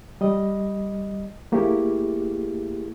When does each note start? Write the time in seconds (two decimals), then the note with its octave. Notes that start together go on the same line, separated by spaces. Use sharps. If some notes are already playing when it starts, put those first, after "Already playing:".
0.21 G3 D#5
1.52 A3 A#3 E4 G4 G#4